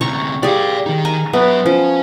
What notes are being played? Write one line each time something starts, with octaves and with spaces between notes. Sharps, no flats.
D2 C3 C#5 A#5 C#6
G3 G#4 D5 F5
D#3 D#4
G#5 A#5
F#3 B3 E5
F3 C#4